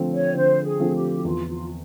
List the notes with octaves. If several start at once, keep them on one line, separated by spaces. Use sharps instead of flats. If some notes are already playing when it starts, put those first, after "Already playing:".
Already playing: D3 F3 A3 C4
C#5
D3 C5
G#4
F3 A3 C4
G4
F#4
E2 F4
F4